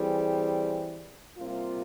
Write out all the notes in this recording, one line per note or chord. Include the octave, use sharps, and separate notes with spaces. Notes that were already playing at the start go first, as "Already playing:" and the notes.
Already playing: E3 G3 C4 G#4
C3 G3 A#3 F4